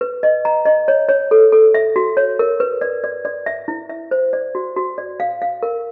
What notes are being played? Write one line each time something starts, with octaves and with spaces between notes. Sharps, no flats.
B4
D#5
A#5
D#5
C#5
C#5
A4
A4
E5
F#4
C#5
A#4
B4
D5
D5
D5
E5
E4
E5
C5
D5
F#4
F#4
D5
F5
F5
A#4